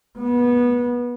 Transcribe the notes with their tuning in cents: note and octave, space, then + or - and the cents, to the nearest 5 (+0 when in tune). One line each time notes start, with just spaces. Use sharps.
B3 -20